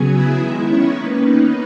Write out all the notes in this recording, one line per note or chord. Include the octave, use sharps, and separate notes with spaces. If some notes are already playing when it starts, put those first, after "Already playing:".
Already playing: C#3 F#3 B3 G#4 G#5
E4 E5
D#3 G#3 B3
C#4 C#5
D#3 A#3 B3 C#4 B4
D#4